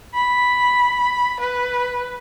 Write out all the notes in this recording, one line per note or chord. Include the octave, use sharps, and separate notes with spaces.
B5
B4